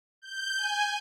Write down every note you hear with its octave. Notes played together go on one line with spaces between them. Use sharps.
G6
G#5